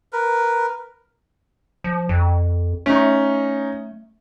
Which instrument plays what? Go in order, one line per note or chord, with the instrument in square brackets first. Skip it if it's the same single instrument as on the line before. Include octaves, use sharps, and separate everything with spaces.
[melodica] A#4 B4
[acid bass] F3
F2
[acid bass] A3 [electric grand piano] C#4 D#4